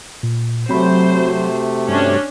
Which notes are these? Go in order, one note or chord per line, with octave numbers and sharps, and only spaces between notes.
A#2
C3 F#3 A3 C4 C5 B5
F#4
G2 C#4 D4